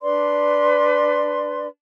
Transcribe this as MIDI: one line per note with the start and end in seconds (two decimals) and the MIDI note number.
0.01 1.67 62
0.01 1.67 71
0.01 1.67 74
0.01 1.67 84